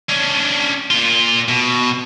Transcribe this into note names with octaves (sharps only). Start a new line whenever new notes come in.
C#4 D4
A#2 F4
B2